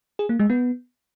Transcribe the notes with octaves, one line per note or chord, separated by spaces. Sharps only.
G#4
A#3
G#3
B3